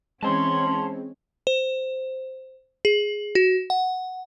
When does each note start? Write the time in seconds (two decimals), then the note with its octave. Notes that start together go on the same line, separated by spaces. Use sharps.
0.23 E3 G#3 C4 C#4 C#5 A5 C6
1.47 C5
2.85 G#4
3.35 F#4
3.70 F#5